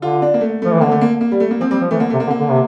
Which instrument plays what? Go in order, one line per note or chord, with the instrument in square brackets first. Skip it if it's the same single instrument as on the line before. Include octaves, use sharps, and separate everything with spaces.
[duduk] D3 [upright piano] F4
[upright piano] D4
A#3
A3
[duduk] F3 [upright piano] A3
[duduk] E3
[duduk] D3 [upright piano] A#3
[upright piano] A3
A#3
A#3
G3
A3
A#3
[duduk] F3 [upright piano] C4
[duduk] G3 [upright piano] C4
[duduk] F3
[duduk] E3 [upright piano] A3
[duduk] D3 [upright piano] A#3
[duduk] C3 [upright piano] A3
[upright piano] A#3
[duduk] D3
[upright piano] A#3
[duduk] D3
C3